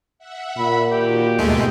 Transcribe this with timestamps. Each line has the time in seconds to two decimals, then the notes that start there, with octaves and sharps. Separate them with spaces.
0.19 E5 F#5
0.58 A#2 B5
0.92 D#3 F#4 G4
1.38 D#2 G#2 B2 G#3 A3